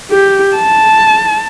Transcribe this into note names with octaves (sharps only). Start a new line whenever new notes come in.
G4
A5